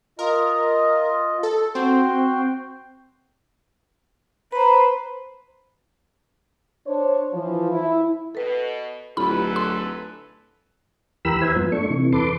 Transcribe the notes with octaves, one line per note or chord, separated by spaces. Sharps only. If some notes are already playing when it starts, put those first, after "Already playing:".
F4 A#4 D#5
A4
C4 F#4 G5 C6
B4 C5 A#5 B5
D4 C5 C#5
E3 F3
E4
B2 A4 B4
D1 F#2 E4 F4 G4 A4 B4 B5
C6
E2 E3 G4 A#4 B5 E6
B4 C5 E5 G#5
G2 F3 B3
A3 D4 C#6
C3 E3
E2 A4 B4 C6 D6